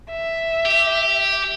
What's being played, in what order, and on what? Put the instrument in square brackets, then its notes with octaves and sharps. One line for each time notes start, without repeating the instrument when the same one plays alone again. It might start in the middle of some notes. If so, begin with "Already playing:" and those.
[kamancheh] E5
[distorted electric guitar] G4